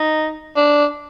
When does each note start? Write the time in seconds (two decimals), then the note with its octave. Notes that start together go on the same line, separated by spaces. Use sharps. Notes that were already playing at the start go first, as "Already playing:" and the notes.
Already playing: D#4
0.56 D4